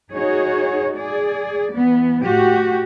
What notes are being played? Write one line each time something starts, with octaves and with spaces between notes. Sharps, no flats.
D#4 F#4 G#4 C#5
G#4 D5
E3 B3
A2 F#4 G4